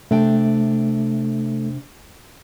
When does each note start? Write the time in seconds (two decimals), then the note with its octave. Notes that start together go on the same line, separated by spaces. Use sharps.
0.11 C3 A3 D4 G5